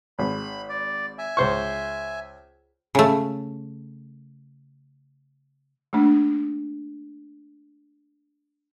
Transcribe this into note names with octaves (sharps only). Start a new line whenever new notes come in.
G#1 B5
D5
E5 G#5
C#2 C5 C#6
C#3 A3
A3 A#3 D4